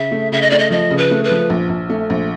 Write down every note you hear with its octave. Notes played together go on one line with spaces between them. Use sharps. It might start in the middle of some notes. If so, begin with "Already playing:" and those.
Already playing: C#3 E5
A3
C#3 E5
D#5
A3 D5
D#5
F3 D#5
C#3
B4
A3
B4
F3
A#1
A#1
A3
A#1